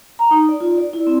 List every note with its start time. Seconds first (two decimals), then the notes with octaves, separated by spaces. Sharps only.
0.19 A#5
0.31 D#4
0.49 D5
0.60 F4
0.78 D5
0.93 E4
1.07 C4